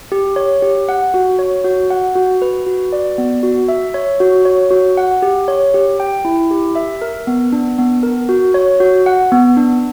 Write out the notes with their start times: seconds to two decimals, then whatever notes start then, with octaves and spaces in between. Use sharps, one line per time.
0.12 G4
0.36 C#5
0.62 G4
0.89 F#5
1.14 F#4
1.39 C#5
1.64 F#4
1.90 F#5
2.15 F#4
2.42 B4
2.66 F#4
2.92 D5
3.18 B3
3.43 F#4
3.68 E5
3.94 C#5
4.20 F#4
4.45 C#5
4.71 F#4
4.97 F#5
5.22 G4
5.48 C#5
5.74 G4
6.00 G5
6.25 E4
6.51 G4
6.75 E5
7.02 A#4
7.27 B3
7.52 D4
7.79 B3
8.03 A#4
8.29 F#4
8.54 C#5
8.80 F#4
9.06 F#5
9.32 B3
9.57 D4